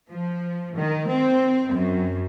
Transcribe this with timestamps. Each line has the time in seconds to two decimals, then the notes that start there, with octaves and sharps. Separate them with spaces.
0.11 F3
0.77 D#3
1.10 C4
1.73 F#2